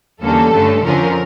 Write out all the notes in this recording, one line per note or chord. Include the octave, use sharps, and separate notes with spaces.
E2 D3 G3 A#3 C#4 A4
G2 D3 A3 C#4
F2 D3 F3 C#4 A#4